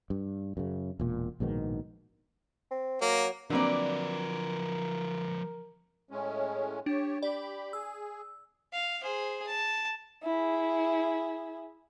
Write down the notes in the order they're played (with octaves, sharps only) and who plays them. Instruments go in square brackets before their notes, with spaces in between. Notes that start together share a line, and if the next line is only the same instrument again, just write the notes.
[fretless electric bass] G2
F#2 C#3
E1 A#2
A#1 G#2 B2 D#3
[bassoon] C4
[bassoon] F#3 [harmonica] A#3
[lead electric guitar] F3 B4 [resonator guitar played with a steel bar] F#3 A#3 D5 [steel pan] C4 D4 [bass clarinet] A#4
[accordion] A2 G#3 C#4
[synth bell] D4 [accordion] G4 C#5
[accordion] G4 B5 [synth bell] D5
[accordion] G#4 [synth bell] E6
[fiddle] F5
G#4 C5
A5
[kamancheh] E4 G#4